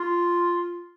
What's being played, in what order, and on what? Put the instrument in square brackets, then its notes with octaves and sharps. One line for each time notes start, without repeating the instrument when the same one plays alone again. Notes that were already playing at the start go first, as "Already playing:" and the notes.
Already playing: [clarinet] F4